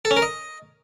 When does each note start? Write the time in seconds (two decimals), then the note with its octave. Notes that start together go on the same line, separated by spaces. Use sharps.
0.05 A4
0.11 C#4
0.17 A#4
0.22 D#5